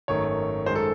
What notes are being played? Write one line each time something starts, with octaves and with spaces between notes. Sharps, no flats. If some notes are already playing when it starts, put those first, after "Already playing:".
G#1 F#2 D#3 A3 C#5
F#2 D#3 G#3 C5
A4